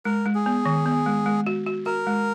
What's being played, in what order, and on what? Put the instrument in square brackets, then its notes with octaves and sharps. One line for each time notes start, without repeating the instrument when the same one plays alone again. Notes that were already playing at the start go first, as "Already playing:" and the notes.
[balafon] G#3 [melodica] A#4
[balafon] G#3
[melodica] G#4
[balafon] B3
D#3
B3
G#3
G#3
F#4
F#4
[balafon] F#4 [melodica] A#4
[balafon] G#3